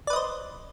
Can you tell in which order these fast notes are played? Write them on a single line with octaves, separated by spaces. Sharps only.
D5 B4 D#5 C5